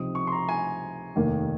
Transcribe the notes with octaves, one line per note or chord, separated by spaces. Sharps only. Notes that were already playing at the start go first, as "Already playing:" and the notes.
Already playing: C#2 C3 F3 C4 D#4 D#6
C#6
C6
A#5
G#5
F1 D#2 D#3 A#3